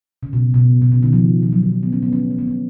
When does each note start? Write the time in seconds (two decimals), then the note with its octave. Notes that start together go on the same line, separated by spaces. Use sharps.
0.23 C#3
0.33 B2
0.54 B2
0.82 B2
0.92 C#3
1.03 D#3
1.13 F3
1.43 F3
1.53 F#3
1.63 D#3
1.72 F3
1.83 B3
1.92 C#4
2.03 B3
2.13 C#4
2.30 C#4
2.38 B3
2.47 C#4